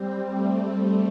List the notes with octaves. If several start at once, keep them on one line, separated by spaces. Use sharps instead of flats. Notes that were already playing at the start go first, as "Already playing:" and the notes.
Already playing: G3 C4
A3